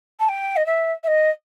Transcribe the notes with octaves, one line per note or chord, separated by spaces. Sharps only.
A5
G5
D#5
E5
E5
D#5